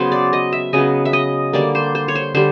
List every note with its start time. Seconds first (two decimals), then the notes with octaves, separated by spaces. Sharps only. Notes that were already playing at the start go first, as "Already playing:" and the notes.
Already playing: C#3 F#3 B3 C5
0.12 D5
0.33 D#5
0.53 E5
0.73 C#3 F#3 B3 D#5
1.05 E5
1.13 D#5
1.53 D3 G3 A#3 D5
1.75 C5
1.95 C5
2.08 C#5
2.15 C5
2.35 D3 G3 C5